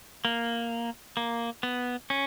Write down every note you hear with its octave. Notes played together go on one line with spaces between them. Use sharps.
A#3
A#3
B3
C#4